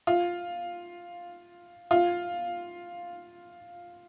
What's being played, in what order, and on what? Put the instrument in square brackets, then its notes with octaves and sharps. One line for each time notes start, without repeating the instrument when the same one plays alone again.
[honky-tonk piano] F4
F4